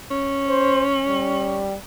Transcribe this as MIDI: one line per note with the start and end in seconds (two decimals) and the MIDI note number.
0.11 1.67 61
0.48 0.83 72
1.06 1.75 55